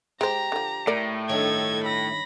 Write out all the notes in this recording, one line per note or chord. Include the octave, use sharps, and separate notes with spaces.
G#3 G4 C5 A#5
D3 F3
A2 A#4 D5
G2 D#3 A4 C#5 G#6
B5 A#6